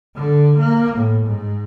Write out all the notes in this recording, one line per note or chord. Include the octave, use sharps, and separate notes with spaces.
D3
A#3
A2
G#2